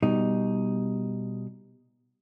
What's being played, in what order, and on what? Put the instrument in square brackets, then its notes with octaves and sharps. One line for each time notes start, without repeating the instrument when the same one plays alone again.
[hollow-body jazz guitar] B2 G3 D#4